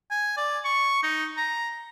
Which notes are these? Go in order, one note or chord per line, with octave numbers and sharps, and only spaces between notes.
G#5
D5
C#6
D#4
A#5